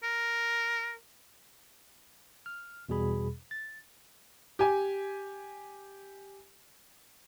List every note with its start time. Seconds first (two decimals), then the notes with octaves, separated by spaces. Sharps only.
0.03 A#4
2.46 F6
2.89 E2 B2 G3 G#4 B5
3.51 A6
4.59 G4 G#5